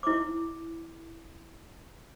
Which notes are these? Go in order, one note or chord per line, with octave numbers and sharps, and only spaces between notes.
E4 D6